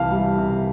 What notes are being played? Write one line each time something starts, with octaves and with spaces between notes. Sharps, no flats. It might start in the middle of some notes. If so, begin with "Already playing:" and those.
Already playing: C2 C3 E3 F5 A5
G3
C3